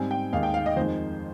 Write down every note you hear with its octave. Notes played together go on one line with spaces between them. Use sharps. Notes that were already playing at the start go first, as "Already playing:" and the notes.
Already playing: G#2 G3 C4 G#5
G5
D#2 D#3 G#3 F5
G5
F5
D#5
F2 D#3 G#3 C5